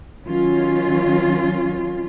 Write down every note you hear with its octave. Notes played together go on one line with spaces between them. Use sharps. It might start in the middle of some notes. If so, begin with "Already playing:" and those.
D#3 F#3 C#4 F4